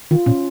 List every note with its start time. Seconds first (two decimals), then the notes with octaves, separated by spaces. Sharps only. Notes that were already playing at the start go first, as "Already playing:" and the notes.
0.11 D#3 F4
0.26 A#2 C#4